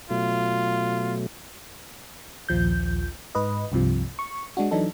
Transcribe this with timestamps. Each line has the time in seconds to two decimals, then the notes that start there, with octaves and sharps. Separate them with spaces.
0.11 B2 F#3 A3 F4
2.49 A#1 D#2 F3 G6
3.35 G#2 B4 D#5
3.72 C2 G2 C3 F3
4.19 C#6
4.57 G#3 D4 F#4
4.71 E3 F#3 D4 D#4 A4